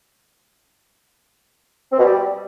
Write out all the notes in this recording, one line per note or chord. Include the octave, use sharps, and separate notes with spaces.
C4
B2
G3